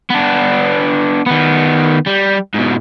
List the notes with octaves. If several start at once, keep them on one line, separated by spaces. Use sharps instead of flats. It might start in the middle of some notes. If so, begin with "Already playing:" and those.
B3 D4
D#3 B3
G3
G#2 B2